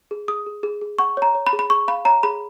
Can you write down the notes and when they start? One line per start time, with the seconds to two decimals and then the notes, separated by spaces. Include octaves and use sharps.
0.11 G#4
0.28 G#4 D#6
0.46 G#4
0.63 G#4
0.81 G#4
0.99 F#5 C#6
1.17 C#5 A#5
1.35 C#5
1.47 B5
1.53 G#4
1.59 B5
1.70 G#4 C#6
1.88 F5 B5
2.05 C#5 A#5
2.23 G#4 B5